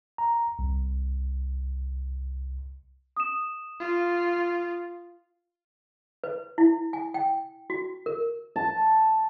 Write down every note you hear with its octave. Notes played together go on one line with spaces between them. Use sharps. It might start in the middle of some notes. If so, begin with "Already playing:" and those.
A#5
C2
D#6 E7
F4
B4
E4
G#5
G5
F#4
A#4
A5